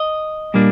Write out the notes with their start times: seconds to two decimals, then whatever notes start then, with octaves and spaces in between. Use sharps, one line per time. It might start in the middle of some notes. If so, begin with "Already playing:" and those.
Already playing: D#5
0.54 A#2 G3 A#3 D4